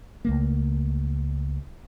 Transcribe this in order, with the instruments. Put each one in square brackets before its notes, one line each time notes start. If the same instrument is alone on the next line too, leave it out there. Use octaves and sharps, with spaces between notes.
[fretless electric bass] C#2 A3 A#3